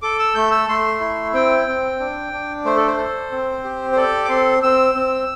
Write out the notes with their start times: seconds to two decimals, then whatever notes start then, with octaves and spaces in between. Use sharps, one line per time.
0.02 A4 D6
0.19 E6
0.35 A3 G6
0.51 E6
0.69 A3 C6
1.01 E4
1.34 C4 G5
1.67 C4
2.00 D4
2.33 D4
2.65 A3 C5
2.76 A4
2.87 C5
2.98 A4
3.32 C4
3.64 G4
3.92 C5
3.96 A4 D5
4.25 D6
4.29 C4 C6
4.63 C4 E6
4.95 C4